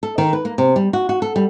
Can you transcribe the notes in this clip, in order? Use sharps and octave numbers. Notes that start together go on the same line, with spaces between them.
A4
D#3
B4
A#3
C3
G3
F#4
F#4
A4
G3